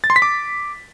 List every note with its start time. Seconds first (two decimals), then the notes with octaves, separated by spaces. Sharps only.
0.04 A6
0.10 C6
0.16 B6
0.22 D6